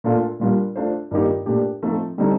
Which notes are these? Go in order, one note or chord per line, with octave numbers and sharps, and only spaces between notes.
A#2 A3 D4 F4 A4
A#2 G3 D4 F4 A#4
A3 D4 F4 C5
G2 D#3 A#3 D#4 G4
A#2 A3 D4 G4
F3 A3 C4 D#4 A4
D3 G3 C4 D#4 A4